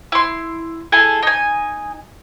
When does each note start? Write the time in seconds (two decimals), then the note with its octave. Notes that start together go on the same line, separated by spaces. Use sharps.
0.12 E4 C6
0.92 E4 G#4 A4 G#5
1.23 D#4 G#5